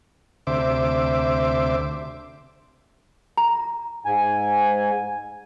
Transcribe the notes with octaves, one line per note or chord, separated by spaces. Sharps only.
D2 C3 C5 E5 D6
A#5
G#2 G#5